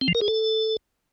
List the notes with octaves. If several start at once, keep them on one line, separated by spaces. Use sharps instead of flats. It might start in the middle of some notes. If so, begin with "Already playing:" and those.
C4
F3
A#4
G#4
A4